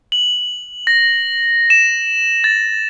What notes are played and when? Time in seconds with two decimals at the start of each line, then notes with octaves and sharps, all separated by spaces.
0.12 F#7
0.87 A#6
1.70 E7
2.44 A6